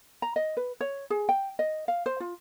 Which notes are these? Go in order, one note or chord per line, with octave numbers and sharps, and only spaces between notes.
A#5
D#5
B4
C#5
G#4
G5
D#5
F5
C5
F4